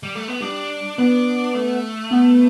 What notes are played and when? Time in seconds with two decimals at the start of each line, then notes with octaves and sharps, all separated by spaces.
0.03 G3
0.15 A3
0.28 B3
0.41 G3 D4
0.98 B3 D4
1.55 A3
2.11 B3